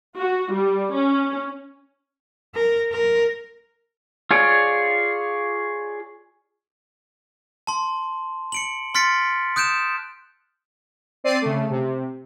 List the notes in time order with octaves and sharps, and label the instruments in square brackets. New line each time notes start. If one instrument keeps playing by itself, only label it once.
[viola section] F#4
G3
C#4
[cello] A#4
A#4
[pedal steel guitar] F4 G#4 C#5 D5
[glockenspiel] A5 C6
C#7 D7 F#7
C6 F6 A6 B6 C#7 D7
D#6 F#6 G6 D7 E7
[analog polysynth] C4 D5 C7 D#7
C#3 A3
C3